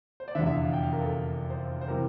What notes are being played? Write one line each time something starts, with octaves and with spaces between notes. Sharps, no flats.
C5
D5
F1 E2 D3 E5
E5
F5
F5
G5
F5
A#4
A4
C5
C5
C3 E3 G3 A#4